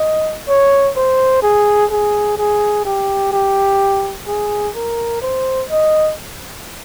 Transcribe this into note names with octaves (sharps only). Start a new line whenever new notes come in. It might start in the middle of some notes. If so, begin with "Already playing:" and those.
Already playing: D#5
C#5
C5
G#4
G#4
G#4
G4
G4
G#4
A#4
C5
D#5